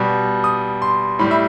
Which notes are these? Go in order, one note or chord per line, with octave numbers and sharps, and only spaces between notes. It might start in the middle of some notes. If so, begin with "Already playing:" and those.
Already playing: B2 G3
D#6
C6
A2 G3 B5
E5